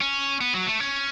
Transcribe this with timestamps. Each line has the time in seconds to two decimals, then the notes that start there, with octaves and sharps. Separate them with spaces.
0.01 C#4
0.41 B3
0.54 F#3
0.67 A3
0.80 C#4